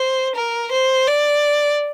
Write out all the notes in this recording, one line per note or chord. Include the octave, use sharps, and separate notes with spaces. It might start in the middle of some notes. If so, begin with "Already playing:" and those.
Already playing: C5
A#4
C5
D5